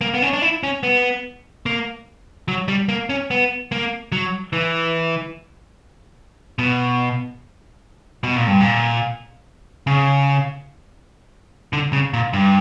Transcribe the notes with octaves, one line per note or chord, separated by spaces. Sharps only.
A#3
B3
C#4
D4
E4
C#4
B3
A#3
F#3
G3
A#3
C#4
B3
A#3
F#3
E3
B2
B2
A#2
G2
A#2
C#3
D3
C#3
A#2
G2